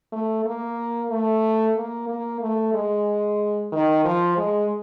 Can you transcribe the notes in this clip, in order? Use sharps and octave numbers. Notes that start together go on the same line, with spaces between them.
A3
A#3
A3
A#3
A#3
A3
G#3
D#3
F3
G#3